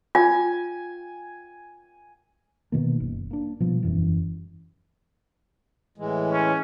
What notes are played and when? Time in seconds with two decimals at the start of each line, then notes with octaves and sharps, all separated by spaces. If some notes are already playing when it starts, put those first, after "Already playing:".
0.15 F4 G#5
2.72 B2 D#3 A#3
3.00 F#1
3.31 A#3 D4
3.60 B2 F3 G3
3.83 E1 F#2 E3
5.98 A2 E3 G#3
6.32 C#4